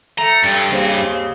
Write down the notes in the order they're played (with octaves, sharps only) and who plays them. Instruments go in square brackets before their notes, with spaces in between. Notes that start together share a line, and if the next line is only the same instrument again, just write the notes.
[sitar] A3 [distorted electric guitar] A#5
[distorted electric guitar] G2
[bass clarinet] D#2 [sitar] C#3 C4